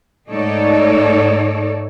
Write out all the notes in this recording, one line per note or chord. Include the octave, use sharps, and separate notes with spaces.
G#2 A3 D#4 A4 C#5 D5